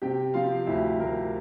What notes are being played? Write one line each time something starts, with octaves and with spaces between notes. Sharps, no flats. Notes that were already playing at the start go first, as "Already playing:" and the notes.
C3 G4 G5
F3 F4 F5
D2 E4 E5
D2 A#4